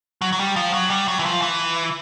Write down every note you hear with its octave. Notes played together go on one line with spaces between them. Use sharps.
F#3
F#3
G3
F3
F#3
G3
F#3
E3
F3
E3